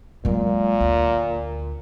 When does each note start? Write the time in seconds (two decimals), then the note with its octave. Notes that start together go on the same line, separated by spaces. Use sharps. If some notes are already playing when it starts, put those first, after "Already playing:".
0.25 A#2 F#3 G#3
0.81 D2